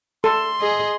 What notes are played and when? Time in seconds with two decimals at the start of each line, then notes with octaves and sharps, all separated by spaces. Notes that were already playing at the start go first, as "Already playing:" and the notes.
0.24 A4 C6
0.60 G#4 D#5